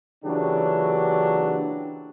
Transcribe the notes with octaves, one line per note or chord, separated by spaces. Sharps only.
A#2 C#3 E3 F#3 D4 G4